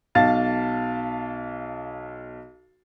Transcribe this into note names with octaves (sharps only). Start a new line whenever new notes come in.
B1 F5 A5 A6